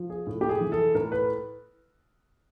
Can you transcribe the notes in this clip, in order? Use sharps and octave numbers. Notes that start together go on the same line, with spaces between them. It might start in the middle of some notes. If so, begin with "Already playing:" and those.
Already playing: F3
G#4
A2
G4
G#4
E3
A4
A2 A#4
B4